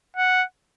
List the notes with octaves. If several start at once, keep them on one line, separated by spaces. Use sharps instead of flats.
F#5